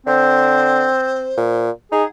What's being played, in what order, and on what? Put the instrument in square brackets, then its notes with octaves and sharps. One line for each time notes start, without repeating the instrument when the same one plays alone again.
[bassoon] D3 [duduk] C4 [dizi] C5
[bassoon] A#2
[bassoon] D#4 [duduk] G#4 [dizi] F#5